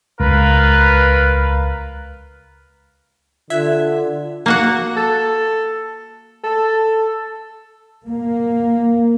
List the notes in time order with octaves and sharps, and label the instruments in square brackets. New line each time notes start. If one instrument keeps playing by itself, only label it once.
[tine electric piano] C#2 [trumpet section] F4 A#4 B4
[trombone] D3 [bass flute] F4 [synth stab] E5 F#6 G#6
[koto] A#3 F#4 F#5
[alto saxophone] A4
A4
[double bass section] A#3